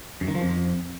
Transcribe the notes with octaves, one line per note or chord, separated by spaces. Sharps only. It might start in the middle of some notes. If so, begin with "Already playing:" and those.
F#2
D#3
F3
F2